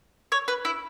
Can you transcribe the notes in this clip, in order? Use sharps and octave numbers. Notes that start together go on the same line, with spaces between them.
C#5
B4
E4